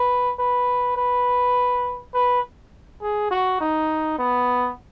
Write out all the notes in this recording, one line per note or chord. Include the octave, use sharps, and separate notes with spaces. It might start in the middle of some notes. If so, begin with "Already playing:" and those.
Already playing: B4
B4
B4
B4
G#4
F#4
D#4
B3